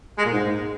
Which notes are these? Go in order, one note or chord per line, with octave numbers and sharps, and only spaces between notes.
G#3
A#2
G#2